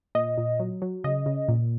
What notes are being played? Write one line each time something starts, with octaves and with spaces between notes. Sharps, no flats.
A#2 D#5
A#2
F#3
F#3
C#3 D#5
C#3
A#2